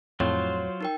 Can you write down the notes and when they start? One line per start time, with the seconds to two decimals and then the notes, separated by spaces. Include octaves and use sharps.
0.20 F2 A2 F#3 F4 C5 C#5
0.81 D#4 A#4 G5